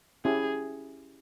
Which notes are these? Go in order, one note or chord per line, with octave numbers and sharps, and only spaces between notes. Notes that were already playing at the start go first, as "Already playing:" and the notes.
C#4 E4 G4 G#4